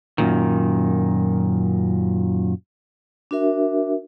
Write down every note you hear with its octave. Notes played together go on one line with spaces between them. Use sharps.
F#2 A#2 D#3
D4 F#4 A#4 E5